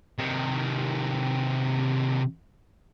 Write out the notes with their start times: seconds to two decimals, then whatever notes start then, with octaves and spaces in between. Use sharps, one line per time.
0.18 C3 D#3